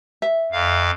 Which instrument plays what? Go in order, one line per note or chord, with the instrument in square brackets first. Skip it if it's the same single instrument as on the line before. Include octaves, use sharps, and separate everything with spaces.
[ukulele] E5
[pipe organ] F2 F5